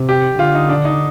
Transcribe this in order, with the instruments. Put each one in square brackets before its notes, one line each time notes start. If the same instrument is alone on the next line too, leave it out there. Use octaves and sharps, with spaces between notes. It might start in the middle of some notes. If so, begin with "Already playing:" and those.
Already playing: [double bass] C3
[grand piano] G4
[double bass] D3 [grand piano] F4
[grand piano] D#4
D4
D#4